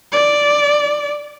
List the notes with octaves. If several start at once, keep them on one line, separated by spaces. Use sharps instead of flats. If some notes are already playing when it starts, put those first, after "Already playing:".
D5